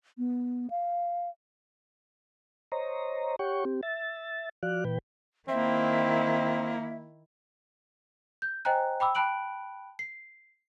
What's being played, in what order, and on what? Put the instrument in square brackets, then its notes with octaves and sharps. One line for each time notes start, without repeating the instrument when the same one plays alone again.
[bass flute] B3
F5
[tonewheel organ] C5 C#5 D#5 A#5
G4 C#5 F#5 G5 C#6
C4 G4
E5 A6
F3 F#4 D5 F5 F#6
A#2 E3 B4 G5
[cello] D#3 E4 [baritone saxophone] A#3 [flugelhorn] C4 [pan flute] E5
[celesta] G6
C5 D#5 G5 G#5 A#5 F#6
G5 B5 D6 E6
G5 A5 B5 F#6 D7 F#7
C7